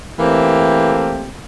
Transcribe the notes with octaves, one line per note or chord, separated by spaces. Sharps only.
E3 A3 A#3 C4 G4